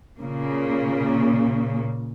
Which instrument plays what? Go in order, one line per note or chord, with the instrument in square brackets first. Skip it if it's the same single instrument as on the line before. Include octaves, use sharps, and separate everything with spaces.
[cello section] A#2 C#3 A#3